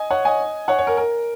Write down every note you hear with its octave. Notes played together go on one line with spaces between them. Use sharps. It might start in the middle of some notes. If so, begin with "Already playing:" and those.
Already playing: D#5 G#5
C#5 F#5
D#5 G#5
C#5 F#5
C#5
A#4
A#4